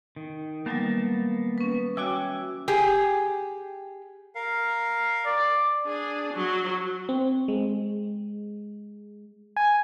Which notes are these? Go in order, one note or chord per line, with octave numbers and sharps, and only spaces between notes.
D#3
D#3 F#3 G3 A#3 B3 A5
C#4 B4
F#4 C#5 E5 G5 G#5 D6
G4 G#4
A#4 F5
D5
D4 G#4
F#3
C4
G#3
G#5